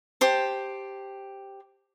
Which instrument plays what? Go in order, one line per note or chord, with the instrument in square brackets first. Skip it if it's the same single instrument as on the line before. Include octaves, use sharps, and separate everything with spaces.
[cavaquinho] G4 C5 A5